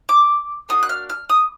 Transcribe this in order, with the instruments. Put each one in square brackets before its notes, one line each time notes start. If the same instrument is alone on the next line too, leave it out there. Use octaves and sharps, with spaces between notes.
[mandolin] D6
A#3 D4 F#4 D#6
F#6
F6
F6
D#6